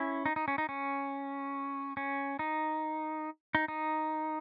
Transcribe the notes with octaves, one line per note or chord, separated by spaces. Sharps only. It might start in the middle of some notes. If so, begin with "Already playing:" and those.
Already playing: C#4 E4
D#4
D#4
C#4
D#4
C#4
C#4
D#4
D#4
D#4